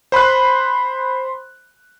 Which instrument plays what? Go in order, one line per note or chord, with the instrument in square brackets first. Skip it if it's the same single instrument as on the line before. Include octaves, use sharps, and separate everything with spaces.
[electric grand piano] C5 B5 C6 F#6